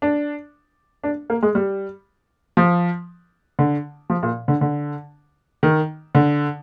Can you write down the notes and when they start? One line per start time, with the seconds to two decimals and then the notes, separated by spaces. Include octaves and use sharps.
0.02 D4
1.04 D4
1.30 A#3
1.43 G#3
1.55 G3
2.57 F3
3.59 D3
4.10 F3
4.23 A#2
4.48 D3
4.61 D3
5.63 D#3
6.15 D3